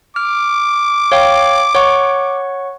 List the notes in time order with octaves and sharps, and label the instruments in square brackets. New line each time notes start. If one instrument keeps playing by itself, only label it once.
[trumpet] D6 [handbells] F6
[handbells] C#5 F5 G5
C#5 F#5 C#6